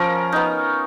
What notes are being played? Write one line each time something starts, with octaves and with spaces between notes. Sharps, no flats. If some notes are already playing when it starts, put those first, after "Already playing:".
Already playing: F3 C#4 F4 A#4 C#5
B3 D#4